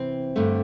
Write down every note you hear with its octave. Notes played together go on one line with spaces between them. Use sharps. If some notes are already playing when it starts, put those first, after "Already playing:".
Already playing: C3 E3 C4
G2 D3 A3